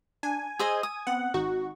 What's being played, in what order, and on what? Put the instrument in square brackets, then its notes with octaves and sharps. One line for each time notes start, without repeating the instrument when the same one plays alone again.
[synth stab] D4 [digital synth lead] G#5
[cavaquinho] G#4 C5 D#5 [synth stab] E6
[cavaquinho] D#6
[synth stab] B3 C4 [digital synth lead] F#5
[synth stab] G#1 D#4 C#6 [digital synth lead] F#4